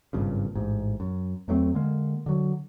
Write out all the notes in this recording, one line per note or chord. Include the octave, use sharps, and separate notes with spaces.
G#1 G2 A#2 C#3
A1 G#2
F#2
E2 F#3 A3 C4
D3 G#3 A#3
D3 F#3